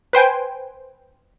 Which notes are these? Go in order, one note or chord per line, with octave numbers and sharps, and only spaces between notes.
B4 C5 G5 G#5